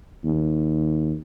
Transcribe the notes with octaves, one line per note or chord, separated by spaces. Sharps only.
D#2